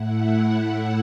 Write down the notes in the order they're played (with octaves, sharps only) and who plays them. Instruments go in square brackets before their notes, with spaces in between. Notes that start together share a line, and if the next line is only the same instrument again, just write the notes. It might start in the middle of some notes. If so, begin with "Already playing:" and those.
Already playing: [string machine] A2 A3 E4 F#5